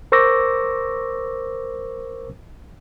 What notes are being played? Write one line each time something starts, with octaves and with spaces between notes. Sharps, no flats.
A#4 C5 C#6 D6 E6 A#6